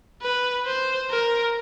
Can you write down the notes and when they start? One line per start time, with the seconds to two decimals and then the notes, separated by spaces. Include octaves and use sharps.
0.22 B4
0.67 C5
1.10 A#4